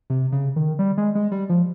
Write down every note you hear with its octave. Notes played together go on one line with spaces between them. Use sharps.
C3
C#3
D#3
G3
G#3
G#3
G3
F3